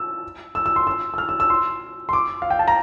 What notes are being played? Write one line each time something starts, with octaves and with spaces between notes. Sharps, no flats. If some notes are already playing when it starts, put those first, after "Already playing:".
Already playing: E6
E6
E6
C6
E6
E6
F6
E6
E6
C6
C6
D6
F5
G5
A5
A#5